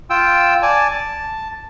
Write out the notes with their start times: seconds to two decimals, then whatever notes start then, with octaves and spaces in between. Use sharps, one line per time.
0.10 F4 G5 E6
0.62 D5 G#5 A5
0.93 A5